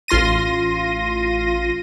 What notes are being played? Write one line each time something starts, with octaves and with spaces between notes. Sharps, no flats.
A1 F4 C6 A#6 D#7